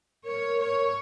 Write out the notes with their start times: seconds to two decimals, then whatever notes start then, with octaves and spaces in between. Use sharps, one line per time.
0.25 A#4 C#5
0.60 C#5